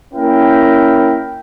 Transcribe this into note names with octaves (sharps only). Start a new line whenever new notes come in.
A#3 C#4 E4 A#4 G5